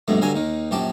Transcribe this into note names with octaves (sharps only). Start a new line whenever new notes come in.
A#1 G2 B2 A3
G2 D3 F#3 F5 G#5
D#2 D#3
A#1 F#2 G4 A5